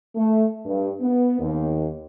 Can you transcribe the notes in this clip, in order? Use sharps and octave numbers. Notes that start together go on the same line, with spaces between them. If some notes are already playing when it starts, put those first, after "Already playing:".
A3
G2
B3
D#2